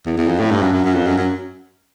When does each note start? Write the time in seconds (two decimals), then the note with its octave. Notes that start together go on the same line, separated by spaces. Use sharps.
0.06 E2
0.17 E2
0.27 F2
0.39 A2
0.51 G2
0.62 F#2
0.73 F#2
0.84 F#2
0.94 F2
1.06 F#2
1.17 F#2